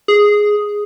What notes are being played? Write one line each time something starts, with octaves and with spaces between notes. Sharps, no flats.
G#4